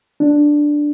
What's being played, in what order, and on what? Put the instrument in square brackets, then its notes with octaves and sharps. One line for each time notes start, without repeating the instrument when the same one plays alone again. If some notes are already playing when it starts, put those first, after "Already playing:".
[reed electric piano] D4